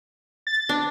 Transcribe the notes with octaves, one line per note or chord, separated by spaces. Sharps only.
A6
D4